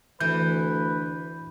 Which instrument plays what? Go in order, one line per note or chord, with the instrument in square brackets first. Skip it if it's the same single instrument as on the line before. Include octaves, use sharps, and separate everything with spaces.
[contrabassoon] D2 [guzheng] E3 [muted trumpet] B4 [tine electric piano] G6